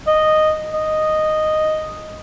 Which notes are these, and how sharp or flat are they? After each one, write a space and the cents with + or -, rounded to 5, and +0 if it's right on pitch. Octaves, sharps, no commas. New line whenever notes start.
D#5 -10
D#5 -5